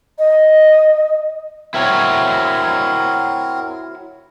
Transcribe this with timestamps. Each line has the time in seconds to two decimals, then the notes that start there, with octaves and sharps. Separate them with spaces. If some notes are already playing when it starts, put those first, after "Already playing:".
0.19 D#5
1.74 C4 E4 F#4 A#4 C#5